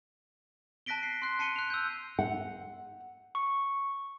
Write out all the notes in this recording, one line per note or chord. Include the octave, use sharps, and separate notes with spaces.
A5 F#6 A#6 B6 D7 G7
C7
C6 F#6 C7
A5 C7 C#7 D#7 G7
F#6 F7
E6 G6
F#5
C#6